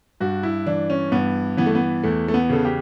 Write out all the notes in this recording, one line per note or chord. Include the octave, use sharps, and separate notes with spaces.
G2 F#4
E4
E3 D4
C#4
G2 B3
E3 B3
A3
B3
E2 A3
A3
B3
C#3 A4
G4